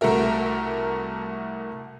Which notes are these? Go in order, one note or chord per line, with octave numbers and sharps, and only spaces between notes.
C2 A3 F#4 A#4 E5